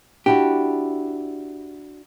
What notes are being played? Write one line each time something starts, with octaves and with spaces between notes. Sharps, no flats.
D4 E4 F#4 G4